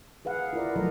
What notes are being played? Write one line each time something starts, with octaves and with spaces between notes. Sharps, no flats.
G#4 B4 F5 F#5
E4 F4 A#4 D5
F3 F#3 A3 A4 A#4 D#5